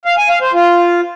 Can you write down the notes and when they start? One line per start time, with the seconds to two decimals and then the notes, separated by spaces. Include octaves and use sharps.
0.05 F5
0.17 G#5
0.29 F5
0.41 C5
0.53 F4